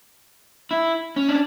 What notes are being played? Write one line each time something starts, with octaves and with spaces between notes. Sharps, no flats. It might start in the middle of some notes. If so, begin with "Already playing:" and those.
E4
C#4
D4